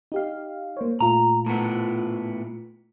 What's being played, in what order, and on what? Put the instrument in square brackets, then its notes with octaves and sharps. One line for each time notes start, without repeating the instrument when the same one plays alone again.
[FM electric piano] D#4 G4 F5
A#3 C5 C#5
[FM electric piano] A#2 A3 F4 [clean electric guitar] A#5
[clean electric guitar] A2 B3